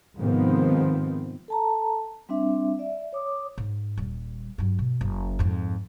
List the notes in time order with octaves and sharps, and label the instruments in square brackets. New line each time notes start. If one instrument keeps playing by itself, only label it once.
[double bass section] G#2 C3 D#3 F3 B3 C4
[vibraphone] A4 A5 A#5
G3 C4 D4 E5
D5 E5
C#5 D6 D#6
[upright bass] G#2
D#1 G3
G2 F#3
B2
F#1
F2 G#2